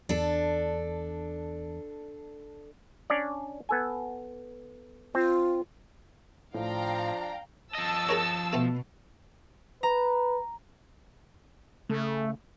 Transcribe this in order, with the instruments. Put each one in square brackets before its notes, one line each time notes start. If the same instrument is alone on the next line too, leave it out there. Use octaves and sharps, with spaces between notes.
[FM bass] E2 [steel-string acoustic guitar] D4 A4
[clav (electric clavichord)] C#4 D4 D5
B3 A4 G#5
[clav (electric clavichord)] C4 [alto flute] F4
[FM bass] A2 [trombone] F3 [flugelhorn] D4 [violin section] F5 G5 A#5
[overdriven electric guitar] F3 D#5 [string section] A5 E6
[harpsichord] G#4 A#4 C#5
[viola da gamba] B2 [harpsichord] A3 B3
[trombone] B4 [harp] A#5
[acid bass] C#3 [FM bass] A3